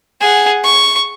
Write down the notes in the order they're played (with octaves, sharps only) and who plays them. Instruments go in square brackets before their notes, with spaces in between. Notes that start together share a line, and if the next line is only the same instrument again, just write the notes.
[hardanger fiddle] G#4 F#5
C#6